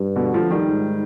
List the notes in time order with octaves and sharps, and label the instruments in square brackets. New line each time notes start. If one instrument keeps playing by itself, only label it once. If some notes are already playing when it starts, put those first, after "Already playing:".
Already playing: [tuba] G2
[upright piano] B2 D3
D3 F3
D#3 G3
[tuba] G#2